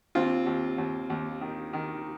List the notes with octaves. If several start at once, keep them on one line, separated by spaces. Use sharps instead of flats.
D#2 C4 F4
D#2
D#2
D#2
D#3
D#3